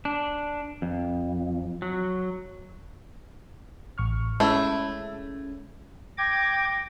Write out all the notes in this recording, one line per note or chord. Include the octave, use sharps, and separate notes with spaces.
D4
F2
F#3
A1 C#6 F6
G#3 A3 C#4 E4
G5 D6 G#6 A#6